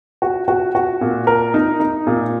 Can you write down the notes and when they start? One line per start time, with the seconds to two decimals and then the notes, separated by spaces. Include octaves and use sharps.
0.22 F#4
0.48 F#4
0.75 F#4
1.01 A#2
1.27 A#4
1.54 D#4
1.80 D#4
2.07 A#2